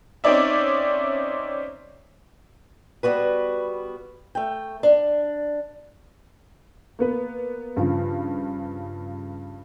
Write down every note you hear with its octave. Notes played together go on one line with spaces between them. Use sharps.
C4 C#4 D#4 C#5 D5 E5
G3 B3 F#4 B4
A3 G5
D4
A#3 B3 B4
G2 C#3 F3